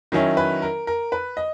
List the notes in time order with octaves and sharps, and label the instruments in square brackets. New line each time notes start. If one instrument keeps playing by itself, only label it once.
[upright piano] D#3 F#3 C#4 E4
B4
A#4
A#4
B4
D#5